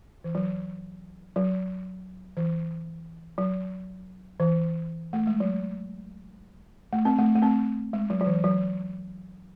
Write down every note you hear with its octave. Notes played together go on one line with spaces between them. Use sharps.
E3
F#3
F#3
E3
F#3
E3
A3
G#3
F#3
A3
C4
A3
A3
C4
G#3
F#3
F#3
E3
F#3